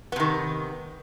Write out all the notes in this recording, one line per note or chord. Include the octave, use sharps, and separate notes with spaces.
C3 D#3 B3